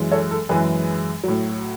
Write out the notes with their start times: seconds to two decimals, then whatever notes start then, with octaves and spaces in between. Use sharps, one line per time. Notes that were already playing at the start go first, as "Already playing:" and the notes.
Already playing: F#2 E3 G#3
0.11 A4 C#5
0.31 A4
0.49 F#2 E3 G#3 G#4 B4
1.23 A2 F#3